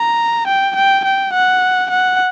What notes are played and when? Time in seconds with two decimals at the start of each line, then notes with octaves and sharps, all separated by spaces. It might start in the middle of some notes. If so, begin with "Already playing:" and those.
Already playing: A#5
0.47 G5
0.76 G5
1.05 G5
1.33 F#5
1.90 F#5